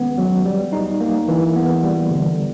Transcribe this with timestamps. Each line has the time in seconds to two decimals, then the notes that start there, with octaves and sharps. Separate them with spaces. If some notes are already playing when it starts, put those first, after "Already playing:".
Already playing: D#3 G#3 B3 C#4
0.18 F#3
0.46 G3
0.73 D#4
1.00 A#3
1.28 E3
1.56 B3
1.83 G3
2.11 D3